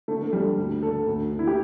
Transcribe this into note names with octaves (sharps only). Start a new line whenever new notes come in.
D3 A3
A3
D3 G3
D2
D3 A4
D2
D3
E4
G4